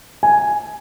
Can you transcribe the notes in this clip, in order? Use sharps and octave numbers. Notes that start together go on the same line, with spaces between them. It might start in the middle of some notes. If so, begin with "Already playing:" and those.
G#5